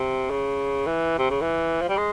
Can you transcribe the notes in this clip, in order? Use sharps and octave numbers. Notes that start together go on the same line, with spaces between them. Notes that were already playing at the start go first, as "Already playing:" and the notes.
Already playing: C3
C#3
E3
C3
C#3
E3
F3
G3
G#3